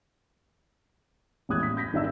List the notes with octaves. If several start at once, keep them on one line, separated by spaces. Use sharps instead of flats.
A1 E2 G#3 D#6 F#6 G#6
B6
G6 A#6 B6
G#1 D#3 D5 E5 E6